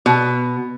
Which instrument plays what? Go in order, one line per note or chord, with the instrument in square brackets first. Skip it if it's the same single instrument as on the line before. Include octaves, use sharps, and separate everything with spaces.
[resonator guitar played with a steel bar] B2